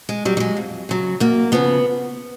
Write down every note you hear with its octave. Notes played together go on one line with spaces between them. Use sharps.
G#3
F#3 G3
G3
G#3
F2
C#3 F#3
F#2 A#3
C#3 F3 B3